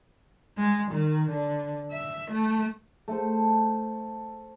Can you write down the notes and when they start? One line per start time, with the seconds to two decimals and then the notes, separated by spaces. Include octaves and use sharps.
0.58 G#3
0.91 D#3
1.31 D3
1.92 E5
2.31 A3
3.08 A3 A4 C5